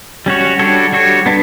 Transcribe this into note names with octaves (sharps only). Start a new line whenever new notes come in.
G3 C#4 F#4 C#5
G3 D4 F#4 A4 C#5
G3 D4 F#4 A4 C#5
B3 D4